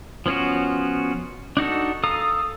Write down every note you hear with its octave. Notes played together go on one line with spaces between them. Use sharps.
F3 B3 C#4 F4 F#4
D4 D#4 F#4 A4
A4 F5 A#5 D#6